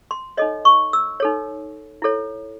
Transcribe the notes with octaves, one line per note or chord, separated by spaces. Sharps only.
C6
D#4 A4 C#5 D#5
C#6
E6
D#4 A4 C#5
E4 A4 C#5